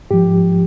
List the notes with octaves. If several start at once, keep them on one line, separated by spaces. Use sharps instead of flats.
G#2 F3 G4